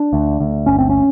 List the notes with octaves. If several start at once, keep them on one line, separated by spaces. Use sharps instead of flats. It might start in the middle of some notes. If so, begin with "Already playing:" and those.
Already playing: D4
D2
D2
G1 C#4
C4
C#4